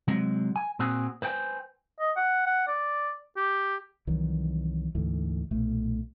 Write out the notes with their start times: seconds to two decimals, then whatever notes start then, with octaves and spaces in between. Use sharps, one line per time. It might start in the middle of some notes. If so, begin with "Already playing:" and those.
0.08 C3 F#3 G#3
0.56 G#5
0.79 A#2 C4 F#4 G#4
1.22 B4 C5 D#5 G5 G#5
2.00 D#5
2.17 F#5
2.46 F#5
2.67 D5
3.37 G4
4.07 C2 D#3 E3 F#3
4.95 D2 G#2 D3 E3
5.51 B1 A#2 A3